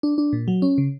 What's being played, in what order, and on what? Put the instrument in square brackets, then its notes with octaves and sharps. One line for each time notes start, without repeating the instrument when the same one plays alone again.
[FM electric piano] D4
D4
A#2
F#3
C#4
C#3